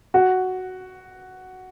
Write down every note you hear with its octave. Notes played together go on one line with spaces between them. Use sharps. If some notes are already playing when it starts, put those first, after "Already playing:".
F#4